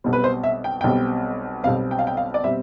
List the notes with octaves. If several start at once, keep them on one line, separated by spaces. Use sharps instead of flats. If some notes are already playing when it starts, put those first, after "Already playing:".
B1 B2 G3 C4
B4
C5
E5
G5
B1 B2 G3 C4 G5
B1 B2 G3 C4 F5
G5
F5
G5
F5
D5
B2 G3 C4 E5